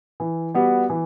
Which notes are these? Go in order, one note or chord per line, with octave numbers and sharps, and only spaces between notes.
E3
G3 B3 F#4
E3